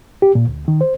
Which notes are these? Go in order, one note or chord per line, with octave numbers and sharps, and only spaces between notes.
G4
A#2
D2
D#3
C5